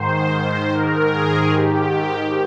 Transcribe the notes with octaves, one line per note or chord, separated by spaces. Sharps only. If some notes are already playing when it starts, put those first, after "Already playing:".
Already playing: G#2 D#3 C5
C5
G#2 D#3 A#4
G#4
G#2 D#3 G4